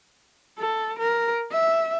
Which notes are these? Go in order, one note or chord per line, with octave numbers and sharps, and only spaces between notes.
A4
A#4
E5